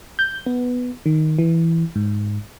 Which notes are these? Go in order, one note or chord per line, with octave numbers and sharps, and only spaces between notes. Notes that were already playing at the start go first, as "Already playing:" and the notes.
G6
B3
D#3
E3
G#2